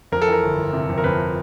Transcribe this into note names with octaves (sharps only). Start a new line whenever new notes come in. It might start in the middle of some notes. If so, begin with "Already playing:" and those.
F2 A#4
A4
E3 A#4
G1
G1
C3
F2
A#4
F2 B4